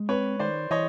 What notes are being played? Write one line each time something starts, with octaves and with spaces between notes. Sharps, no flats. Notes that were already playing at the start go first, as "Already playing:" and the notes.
Already playing: G#3
C4 B4 C#5
D#3 C5 D5
E3 C#5 D#5